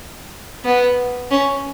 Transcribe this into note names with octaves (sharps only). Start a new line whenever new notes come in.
B3
C#4